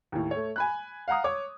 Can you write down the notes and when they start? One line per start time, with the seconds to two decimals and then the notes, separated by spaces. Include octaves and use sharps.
0.12 D#2 A2
0.31 A3 C#5
0.56 G#5 B5 F#6
1.08 F5 F#5 A#5 D#6
1.24 C#5 D6